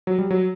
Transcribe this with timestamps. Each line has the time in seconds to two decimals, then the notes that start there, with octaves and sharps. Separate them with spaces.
0.07 F#3
0.19 G3
0.31 F#3